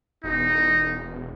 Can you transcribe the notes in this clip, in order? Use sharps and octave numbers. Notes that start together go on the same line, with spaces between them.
E1 D#4